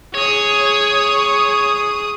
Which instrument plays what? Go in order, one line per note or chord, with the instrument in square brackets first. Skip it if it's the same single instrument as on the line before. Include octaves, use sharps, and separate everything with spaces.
[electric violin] G#4 D#6 [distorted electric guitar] C#5